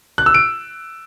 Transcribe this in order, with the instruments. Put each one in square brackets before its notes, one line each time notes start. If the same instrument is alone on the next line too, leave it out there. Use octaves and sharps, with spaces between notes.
[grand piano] F#6
E6
D7